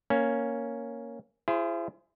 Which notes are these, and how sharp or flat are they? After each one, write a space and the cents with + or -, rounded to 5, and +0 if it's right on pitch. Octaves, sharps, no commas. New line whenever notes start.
A#3 +0 C#4 +0
E4 +40 G#4 +0 C5 +0